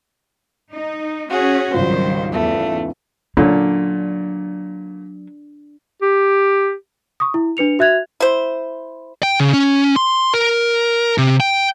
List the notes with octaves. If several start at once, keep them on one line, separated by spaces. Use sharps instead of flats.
D#4
C#4 F#4 G#4
G#1 C#2 D#3 F#3 G3 C5
E2 A3
A#2 D3 F#3 C#4 D4
G4
C#6 D#6
E4
D4 B4 C#7 F7
F#4 E5 F#6 G#6 F7
E4 C5
G5
C#3
C#4
C6
A#4
C3
G5